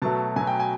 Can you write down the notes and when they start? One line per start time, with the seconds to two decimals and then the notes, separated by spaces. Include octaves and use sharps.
0.02 B2 F#3 A3 A5
0.36 B2 F#3 A3 G#5
0.47 G5
0.60 G#5